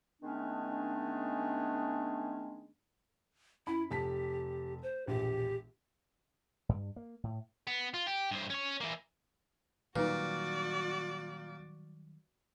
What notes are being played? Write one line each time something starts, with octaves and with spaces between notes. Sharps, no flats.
D#3 G#3 A3 B3 C#4 D4
F#2 E4 B5
F1 G4 A5 B6
C5
E1 A#1 G4
G2
A#3
A2
B3
F4
G4
G2 C5
C#4 C#5
E3 A#3
A#2 D#3 F#3 G3 D#4 F#4 B4 D5